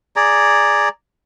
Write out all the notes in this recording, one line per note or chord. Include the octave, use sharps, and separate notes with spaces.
G#4 D5 A#5